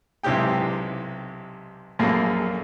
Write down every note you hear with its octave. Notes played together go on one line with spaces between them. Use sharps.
B1 G#2 C3 E4 G4 G5
A#1 F#2 A#3 G#4 A4